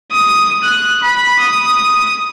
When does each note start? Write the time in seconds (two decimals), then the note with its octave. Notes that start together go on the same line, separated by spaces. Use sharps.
0.12 D#6
0.64 F#6
1.03 B5
1.40 D#6